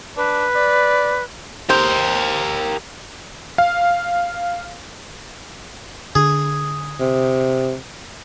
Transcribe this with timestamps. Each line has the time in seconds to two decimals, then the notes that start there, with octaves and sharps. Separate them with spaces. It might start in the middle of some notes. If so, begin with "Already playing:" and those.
0.17 D4 B4
0.55 D5
1.70 G4 A#4 C5
3.58 F5
6.15 D3 G#4
7.00 C3